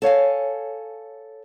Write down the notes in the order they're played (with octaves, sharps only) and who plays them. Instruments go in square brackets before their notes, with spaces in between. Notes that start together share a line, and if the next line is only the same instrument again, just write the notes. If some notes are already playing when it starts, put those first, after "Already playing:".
[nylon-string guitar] A4 C#5 F5 G#5